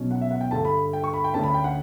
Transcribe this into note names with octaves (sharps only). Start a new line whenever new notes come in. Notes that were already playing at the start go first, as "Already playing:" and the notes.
Already playing: B1 B2 F#3 C#4
F#5
E5
F#5
G5
G2 D3 A3 A5
B5
G5
C#6
B5
G5
D2 D3 A3 C#4 A5
B5
G5
F#5